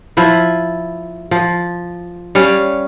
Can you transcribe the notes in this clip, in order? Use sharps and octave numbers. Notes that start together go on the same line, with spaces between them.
F3 E4 B4
F3
G3 C#4 C#5 F5